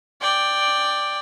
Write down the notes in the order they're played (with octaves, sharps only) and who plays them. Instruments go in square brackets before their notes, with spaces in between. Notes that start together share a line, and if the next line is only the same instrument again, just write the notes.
[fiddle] D5 G5